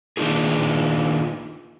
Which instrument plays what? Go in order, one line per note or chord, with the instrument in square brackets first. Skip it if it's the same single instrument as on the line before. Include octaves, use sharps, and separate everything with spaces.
[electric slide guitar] D#3 A#3 D4 D#4 F4 G#4